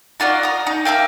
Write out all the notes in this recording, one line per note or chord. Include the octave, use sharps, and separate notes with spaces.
D#4 F4 F#4 D5
A#5 D#6
D#4
A#3 E5 F5 G5